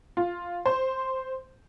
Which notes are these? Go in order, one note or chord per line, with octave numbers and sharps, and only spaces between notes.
F4
C5